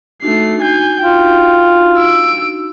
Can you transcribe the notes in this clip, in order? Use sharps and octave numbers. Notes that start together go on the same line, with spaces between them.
A3 D4 D#4 F#4 C7
G#5 G6
F4 G5
E6 D7